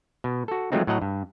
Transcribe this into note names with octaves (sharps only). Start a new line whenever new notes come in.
B2
F#4 A4
F3 F#3 G#3 A3 C4 D#4
A2 F#3 D#5 F#5 A#5
G2